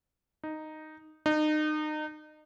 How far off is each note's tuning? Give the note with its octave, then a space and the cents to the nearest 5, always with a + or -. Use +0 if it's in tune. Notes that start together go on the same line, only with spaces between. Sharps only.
D#4 -5
D#4 -30